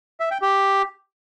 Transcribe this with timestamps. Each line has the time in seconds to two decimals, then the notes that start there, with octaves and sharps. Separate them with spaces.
0.20 E5
0.31 G5
0.42 G4